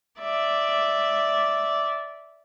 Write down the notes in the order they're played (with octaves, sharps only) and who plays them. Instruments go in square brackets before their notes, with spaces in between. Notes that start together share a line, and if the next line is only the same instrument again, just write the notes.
[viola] D5 E5